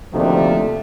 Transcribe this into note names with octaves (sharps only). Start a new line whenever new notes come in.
D2 C3 D#3 F3 A3 A#3 D4